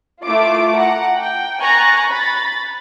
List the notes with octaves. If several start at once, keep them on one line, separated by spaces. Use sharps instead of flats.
A3 E4 F4 D6 D7
F#5 A#5
G5
G#5 A#5 C#6 F#6 A6
B5 A6